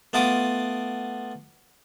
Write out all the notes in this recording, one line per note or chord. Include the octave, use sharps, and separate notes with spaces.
A3 B3 F4 A5 D6 D#6